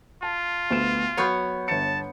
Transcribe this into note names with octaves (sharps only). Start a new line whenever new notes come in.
F4 A5
D2 B3 E7
F#3 B3 C#5 C#6 G6
G1 A5 C#7